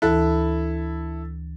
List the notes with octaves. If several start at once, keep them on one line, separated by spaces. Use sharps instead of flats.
D2 E3 E4 A4 F#6